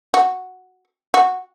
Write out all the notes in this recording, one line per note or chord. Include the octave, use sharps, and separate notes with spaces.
F#4
F#4